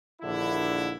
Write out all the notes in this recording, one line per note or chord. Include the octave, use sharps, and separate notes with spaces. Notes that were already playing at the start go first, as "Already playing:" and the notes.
A#1 D#2 D3 E4